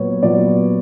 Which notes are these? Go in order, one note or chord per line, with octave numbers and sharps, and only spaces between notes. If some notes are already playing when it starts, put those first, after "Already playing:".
Already playing: A#2 F#3 B3 C#5
A#2 F#3 B3 D5